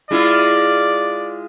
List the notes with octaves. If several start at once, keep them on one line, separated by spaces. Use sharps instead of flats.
G#3 E4 F4 D5